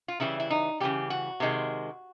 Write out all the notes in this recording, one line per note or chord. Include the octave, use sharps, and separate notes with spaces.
F4
C#3 E3 G3 E4
E4
D#4
C#3 E3 G3 G4
F#4
C3 D#3 G#3